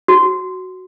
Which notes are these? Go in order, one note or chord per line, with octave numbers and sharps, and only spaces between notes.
F#4